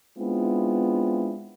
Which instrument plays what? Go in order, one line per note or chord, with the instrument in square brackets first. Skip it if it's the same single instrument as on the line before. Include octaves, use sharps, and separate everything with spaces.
[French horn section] G#3 B3 C4 D4 E4 F4